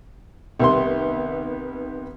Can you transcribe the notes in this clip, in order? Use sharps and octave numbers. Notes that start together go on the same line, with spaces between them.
C2 C3 D#3 B3 C6